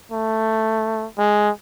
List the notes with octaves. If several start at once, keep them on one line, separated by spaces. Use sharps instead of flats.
A3
G#3